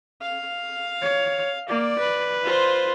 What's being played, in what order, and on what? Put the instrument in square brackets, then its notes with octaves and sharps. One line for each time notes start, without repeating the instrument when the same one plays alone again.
[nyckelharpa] F5
[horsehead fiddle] C#5
[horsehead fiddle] A#3 [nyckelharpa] D5
[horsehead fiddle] B4
[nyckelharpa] F4 C5